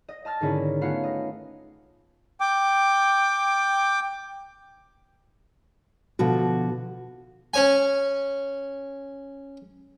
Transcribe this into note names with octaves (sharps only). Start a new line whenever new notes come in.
D#5
D#5 A5 F6 A6 A#6
G#2 D3 D#3 C#4 E4
A3 B3 C#4 F4 F5 F#5
D#5
G5 D6
B2 D3 F3 F#4
C#4 C#5 G#5